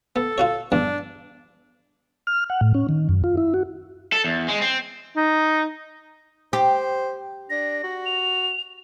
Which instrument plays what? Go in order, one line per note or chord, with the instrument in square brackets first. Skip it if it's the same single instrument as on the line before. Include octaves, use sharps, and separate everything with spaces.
[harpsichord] B3 [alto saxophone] A4
[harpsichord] F4 F#4 C#5
[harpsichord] E2 G2 [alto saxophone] D4
[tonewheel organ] F6
F#5
A2
C#4
D#3
F#2
F4
E4
F#4
[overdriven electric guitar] A4
E2
G#3
C4
[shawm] D#4
[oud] G4 [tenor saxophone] C5
[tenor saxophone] D4 [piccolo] A#6
[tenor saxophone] F#4
[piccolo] F7